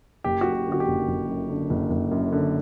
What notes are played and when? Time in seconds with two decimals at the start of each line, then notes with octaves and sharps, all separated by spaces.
0.24 F#1 G4
0.41 F#2 F#4
0.53 G4
0.66 D3
0.72 F#4
0.80 G4
0.88 F#1
1.08 F#1
1.28 F#2
1.50 D3
1.70 F#1
1.90 F#1
2.11 F#2
2.32 D3